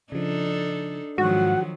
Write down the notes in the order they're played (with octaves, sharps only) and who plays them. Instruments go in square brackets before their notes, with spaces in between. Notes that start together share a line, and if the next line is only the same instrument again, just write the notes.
[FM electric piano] C#3 F3 [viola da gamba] D4 D#4 A4
[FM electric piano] G#2 [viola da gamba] D#3 F3 F#3 [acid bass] F#4 [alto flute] F#5